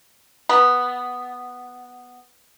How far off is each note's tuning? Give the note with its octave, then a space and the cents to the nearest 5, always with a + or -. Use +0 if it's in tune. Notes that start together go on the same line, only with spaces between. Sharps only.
B3 +0 B5 -25